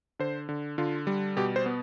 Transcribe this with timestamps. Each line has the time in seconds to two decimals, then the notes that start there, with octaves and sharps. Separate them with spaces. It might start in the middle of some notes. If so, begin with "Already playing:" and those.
0.19 D3 C5
0.49 D3
0.78 D3 F4
1.07 G3
1.37 B2 G4
1.56 C5
1.66 B3